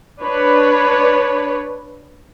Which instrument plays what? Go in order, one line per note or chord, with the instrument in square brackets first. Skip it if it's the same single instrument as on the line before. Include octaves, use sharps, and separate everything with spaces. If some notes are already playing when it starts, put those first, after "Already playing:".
[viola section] D4 B4 C#5